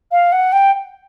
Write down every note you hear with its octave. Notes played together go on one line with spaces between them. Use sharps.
F5
F#5
G5